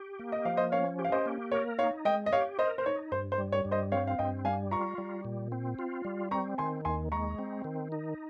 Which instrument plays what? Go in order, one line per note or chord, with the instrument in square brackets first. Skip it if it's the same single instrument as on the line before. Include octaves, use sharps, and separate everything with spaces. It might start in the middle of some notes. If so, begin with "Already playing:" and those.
Already playing: [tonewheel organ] G4
A#3
[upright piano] D#5
[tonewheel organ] F3 [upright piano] F5
[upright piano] C5 D#5
[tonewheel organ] C#4 [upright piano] C#5 F5
[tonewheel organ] G4
[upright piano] F5
C5 D#5
[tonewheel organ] A#3
[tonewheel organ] A#4 [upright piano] C#5
[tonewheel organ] D#4 [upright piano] C#5 F5
[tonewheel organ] G#3 [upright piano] D#5 G5
[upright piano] D#5
[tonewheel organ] G4 [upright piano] C#5 F5
[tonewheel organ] A#4 [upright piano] C5 D#5
[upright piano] C5
[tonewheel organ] D#4 [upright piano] C#5
[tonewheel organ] G2 [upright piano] C5
[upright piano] C5
[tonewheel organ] G3
[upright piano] C#5
[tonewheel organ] G2
[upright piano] C5 D#5
[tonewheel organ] C4 [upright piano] C#5 F5
[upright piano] F5
[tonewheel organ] G2 [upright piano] D#5 G5
[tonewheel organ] G3 [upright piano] F5 G#5
[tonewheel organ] F4 [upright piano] A#5 C#6
[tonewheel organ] G3
A#2
C4
F4
G3
[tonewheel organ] C4 [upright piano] A#5 C#6
[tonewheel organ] D#3 [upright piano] G#5 C6
[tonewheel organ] D#2 [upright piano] G#5 C6
[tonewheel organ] G#3 [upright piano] A#5 C#6
[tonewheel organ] C4
D#3
D#4